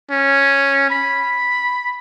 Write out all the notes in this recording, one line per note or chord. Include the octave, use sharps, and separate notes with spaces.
C#4
B5